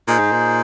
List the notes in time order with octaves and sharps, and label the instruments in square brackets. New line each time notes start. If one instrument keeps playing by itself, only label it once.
[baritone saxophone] A#2 [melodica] D#4 G#4 C5
[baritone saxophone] G#2
A#2